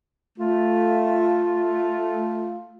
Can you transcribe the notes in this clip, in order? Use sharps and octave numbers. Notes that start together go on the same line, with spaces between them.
A3 F4